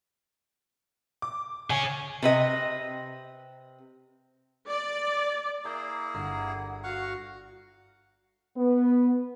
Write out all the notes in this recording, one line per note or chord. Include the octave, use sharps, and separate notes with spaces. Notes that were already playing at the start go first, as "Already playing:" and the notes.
D6
G#4 C#5 G#5
C3 B4 D#5
D5
A#3 E4 G#4 A#5 G6
G1 F#5 A#5 C7
F#4 F5 F#5 C#6
B3